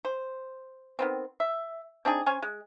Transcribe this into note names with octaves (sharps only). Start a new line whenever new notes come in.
C5
D#3 B3 C4
E5
C4 D4 D#4 G#4
C#4 C5 C#5 G#5
G#3